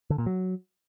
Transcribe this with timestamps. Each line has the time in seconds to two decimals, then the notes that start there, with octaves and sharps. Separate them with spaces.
0.10 D3
0.18 A#2
0.26 F#3